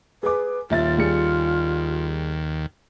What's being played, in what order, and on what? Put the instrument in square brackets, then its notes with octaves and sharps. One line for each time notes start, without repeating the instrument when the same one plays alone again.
[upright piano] G#4 D6 [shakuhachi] B4
[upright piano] D#1 E5 A6 [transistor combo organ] D#2 [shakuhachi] F4
[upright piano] G3 G#4 C#7